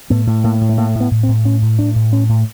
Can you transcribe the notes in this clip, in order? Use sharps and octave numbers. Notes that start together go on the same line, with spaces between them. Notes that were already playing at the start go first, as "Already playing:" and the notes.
A2 B3
A2
A2 A#3
A2
A3
A2 A#3
A2
B3
A2
C4
A2
A2 C#4
A2
A2 D4
A2
A2 C#4
A2